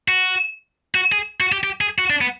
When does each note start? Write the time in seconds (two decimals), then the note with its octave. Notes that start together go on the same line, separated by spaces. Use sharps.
0.08 F#4
0.95 F#4
1.12 G#4
1.40 F#4
1.52 G4
1.63 G4
1.81 G#4
1.98 F#4
2.10 D4
2.21 B3